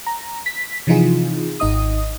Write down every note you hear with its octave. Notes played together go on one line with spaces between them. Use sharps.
A#5
B6
C3 E3 F3 D#4 F4 G#4
G#1 D#4 D#5 D#6